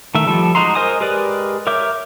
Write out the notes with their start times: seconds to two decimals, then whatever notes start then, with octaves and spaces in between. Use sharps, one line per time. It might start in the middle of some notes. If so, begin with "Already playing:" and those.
0.15 D#3 A3 E5
0.27 F3 G3 A4
0.55 G#3 D#4 F#4 A#5 C6
0.75 A#4 C5 D#5 G#5 D#6
1.00 G#3 G4 A#4 B4 D5
1.67 A#4 C#5 E5 D6 G6